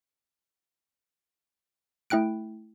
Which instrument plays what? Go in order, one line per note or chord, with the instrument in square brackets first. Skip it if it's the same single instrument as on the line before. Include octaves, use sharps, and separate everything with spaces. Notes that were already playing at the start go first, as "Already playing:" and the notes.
[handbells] A3 E4 G5 F#6 D7